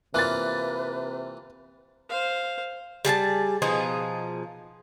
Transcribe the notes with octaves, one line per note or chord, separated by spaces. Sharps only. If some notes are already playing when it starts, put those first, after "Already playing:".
C3 E3 A#3 F4 B4 F#6 A6
C5 F5
G3 G#4 F5 A5
B2 F3 D#4 G#4